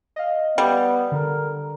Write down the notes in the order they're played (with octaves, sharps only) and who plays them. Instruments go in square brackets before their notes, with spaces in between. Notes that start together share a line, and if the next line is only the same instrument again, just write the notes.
[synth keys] D#5 F5
[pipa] G3 [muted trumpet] B3
[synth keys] D3 [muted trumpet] A#4